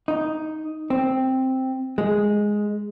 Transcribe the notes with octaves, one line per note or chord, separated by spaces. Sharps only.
D#4
C4
G#3